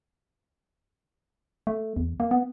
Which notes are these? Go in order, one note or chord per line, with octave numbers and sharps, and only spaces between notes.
A3
E2
A#3
B3